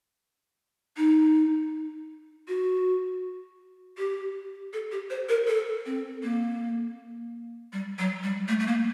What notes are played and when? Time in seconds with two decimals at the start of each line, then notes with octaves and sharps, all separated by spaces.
0.97 D#4
2.48 F#4
3.98 G4
4.73 A4
4.92 G4
5.10 C5
5.29 A#4
5.48 A4
5.86 C4
6.23 A#3
7.73 G3
7.99 F#3
8.23 G3
8.48 A3
8.60 A3
8.67 A#3